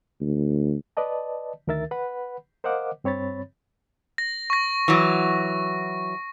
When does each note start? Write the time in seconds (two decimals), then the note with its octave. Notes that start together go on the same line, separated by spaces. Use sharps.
0.21 D2
0.97 B4 D5 D#5 A5
1.67 D2 D#3 A#4 E5 A6
1.91 B4 F#5 B5
2.64 A#4 C5 D#5 F5 F#5 D6
3.04 G2 C4 C#5 B5 A6
4.18 A#6
4.50 C#6 A#6
4.88 E3 F#3